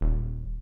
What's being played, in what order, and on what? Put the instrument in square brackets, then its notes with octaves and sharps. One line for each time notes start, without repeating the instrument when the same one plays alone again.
[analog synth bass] D#1